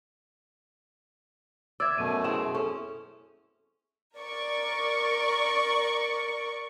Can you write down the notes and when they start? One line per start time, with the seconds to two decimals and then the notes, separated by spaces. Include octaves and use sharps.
1.80 D5 E5 E6 G#6
1.98 F#2 B2 A3 D#7
2.24 C4 E4 G#4 E7
2.55 C#4 A4
4.17 A#4 D5 C#6